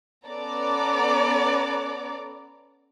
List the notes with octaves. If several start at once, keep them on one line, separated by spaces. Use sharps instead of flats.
B3 C#4 A4 D5 A#5 D6